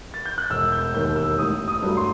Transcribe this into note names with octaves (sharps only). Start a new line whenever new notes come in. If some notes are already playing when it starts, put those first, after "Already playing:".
A6
G6
F#6
E1 E6
G6
D#2 D#3 G6
E6
A1 D#6
D#6
G2 F#3 A3
C6